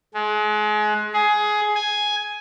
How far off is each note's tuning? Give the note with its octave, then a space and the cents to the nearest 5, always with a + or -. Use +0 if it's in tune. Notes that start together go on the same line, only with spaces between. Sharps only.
G#3 +30
G#4 +15
G#5 +5